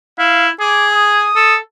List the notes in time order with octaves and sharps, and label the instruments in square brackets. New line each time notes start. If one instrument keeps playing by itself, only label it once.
[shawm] E4 [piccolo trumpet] F5
[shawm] G#4 [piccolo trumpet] D6
[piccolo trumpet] D#6
[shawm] A4